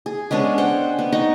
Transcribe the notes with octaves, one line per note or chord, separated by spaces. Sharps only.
G#4
G#3 B3 C#4 D4
C5 F#5 G5
B3
D#4 D#5 C#6